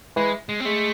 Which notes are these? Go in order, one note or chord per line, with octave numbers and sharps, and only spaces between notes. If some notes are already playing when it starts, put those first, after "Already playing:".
E3 G#3
G#3
C4
G#3 A3